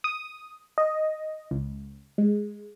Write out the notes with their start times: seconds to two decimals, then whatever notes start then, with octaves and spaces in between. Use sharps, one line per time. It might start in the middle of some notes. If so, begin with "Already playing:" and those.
0.04 D#6
0.78 D#5
1.51 C#2
2.18 G#3